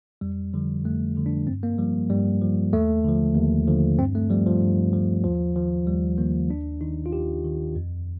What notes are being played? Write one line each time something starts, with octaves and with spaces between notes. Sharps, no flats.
F2 G3
D3 F3 G3
F2 A3
D3 F3
D4
G2 C4
A#3
F3 G3
G2 G3
F3
D#2 A3
D3 F3
D#2
D3 F3
G2 C4
A3
F3 G3
F3
G2
F3
D#2 F3
D#3 F3
D#2 G3
D#3 A#3
D#2 D4
D#3 D#4
F4
D#2 G4
D#3
F2